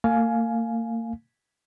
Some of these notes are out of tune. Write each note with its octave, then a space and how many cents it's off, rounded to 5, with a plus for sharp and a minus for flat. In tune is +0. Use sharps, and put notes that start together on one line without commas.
A#3 -40 F5 +0 G#5 +15